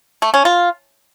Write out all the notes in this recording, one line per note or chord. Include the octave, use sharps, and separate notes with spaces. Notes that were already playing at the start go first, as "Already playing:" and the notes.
A3
C#4
F4